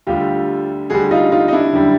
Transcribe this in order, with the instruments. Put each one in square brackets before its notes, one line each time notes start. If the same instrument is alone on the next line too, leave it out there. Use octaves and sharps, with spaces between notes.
[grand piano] D2 D3 G3 [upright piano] F4 G4
[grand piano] D2 D3 G3 [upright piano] F#4 G#4
[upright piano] D#4 F4
D#4 F4
D#4
D4 E4
[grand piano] F#2 D3 G3